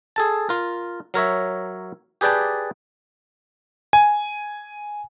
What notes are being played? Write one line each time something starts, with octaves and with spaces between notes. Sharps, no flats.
G#4 A4 A5
F4 A#4
F#3 A#4 C#5 E5
G4 G#4 B4 D5 G5 A5
G#5